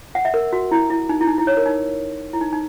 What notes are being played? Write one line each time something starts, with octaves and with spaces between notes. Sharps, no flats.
F#5
E5
A#4
F#4
E4
E4
D#4
E4
D#4
E4
C#5
A#4
D#4
E4
D#4
D#4